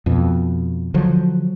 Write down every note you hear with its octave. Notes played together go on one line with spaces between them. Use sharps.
F2 B2
D3 F3 F#3